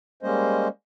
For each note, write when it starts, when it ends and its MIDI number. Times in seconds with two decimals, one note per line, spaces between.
0.23 0.68 55
0.23 0.68 56
0.23 0.68 58
0.23 0.68 61
0.23 0.68 72
0.23 0.68 75